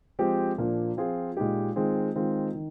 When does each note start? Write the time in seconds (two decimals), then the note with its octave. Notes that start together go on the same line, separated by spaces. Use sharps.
0.19 F3 G#3 C4 G4
0.58 A#2 F3 A#3 D4
0.97 F3 C4 F4 G#4
1.37 A#2 G#3 D#4 G4
1.76 D#3 G#3 C4 F4 G#4
2.16 D#3 G#3 C4 F4
2.54 D#3